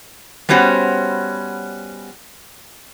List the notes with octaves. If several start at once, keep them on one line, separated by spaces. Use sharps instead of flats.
G3 B3 C#4 F#4 C5